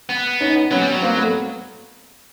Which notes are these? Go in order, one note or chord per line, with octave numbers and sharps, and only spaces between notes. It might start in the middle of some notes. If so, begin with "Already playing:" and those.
B3
C#4 D#4
F#3 B3 C#4
G3
F#3
A#3 C4
A3 B3